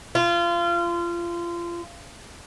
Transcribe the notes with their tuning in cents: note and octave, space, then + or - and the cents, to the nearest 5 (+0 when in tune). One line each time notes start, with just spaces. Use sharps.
F4 -25